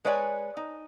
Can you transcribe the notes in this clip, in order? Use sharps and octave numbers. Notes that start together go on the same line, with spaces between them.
G#3 B4 C#5 D5 F5 G#5
D#4